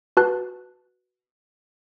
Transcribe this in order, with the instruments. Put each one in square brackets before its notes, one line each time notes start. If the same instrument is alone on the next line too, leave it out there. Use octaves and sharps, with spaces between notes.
[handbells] F#4 B4 A5 F#6